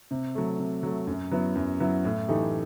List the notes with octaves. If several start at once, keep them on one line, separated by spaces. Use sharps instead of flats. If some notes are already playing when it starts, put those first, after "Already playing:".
C3
F#3 A3
C3
F#3 A3
F#2
F#3 B3 E4
F#2
F#3 B3 E4
A2
E3 A3 D#4 G4